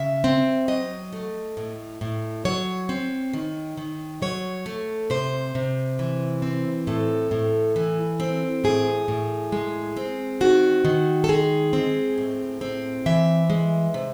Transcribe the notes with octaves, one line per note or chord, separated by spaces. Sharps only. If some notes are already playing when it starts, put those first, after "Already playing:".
Already playing: C#3 E5
C4
F#3 D#5
A3
A2
A2
F#3 C#5
C4
D#3
D#3
F#3 C#5
A3
C3 C5
C3
E3
C4
A2 A4
A2
E3
C4
A2 G#4
A2
G#3
C4
D#3 F#4
D#3
A4
G#3 G#4
C4
A2
C4
E3 E5
G#3
C3